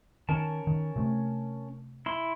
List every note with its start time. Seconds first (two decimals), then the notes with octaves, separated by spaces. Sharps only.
0.29 D#3 C#4 A#4 A5
0.67 D#3
0.96 C3 A3
2.06 E4 C6